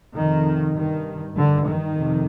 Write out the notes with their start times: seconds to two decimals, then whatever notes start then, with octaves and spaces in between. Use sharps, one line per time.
0.16 F2 C3 D#3
0.76 G2 D#3
1.36 G2 D3
1.67 D#3
1.97 F2 C3